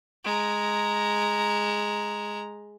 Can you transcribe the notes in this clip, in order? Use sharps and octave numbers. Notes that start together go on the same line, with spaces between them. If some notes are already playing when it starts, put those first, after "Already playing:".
G#3 A#5